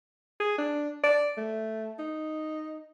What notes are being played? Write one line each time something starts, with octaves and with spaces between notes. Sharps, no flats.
G#4
D4
D5
A3
D#4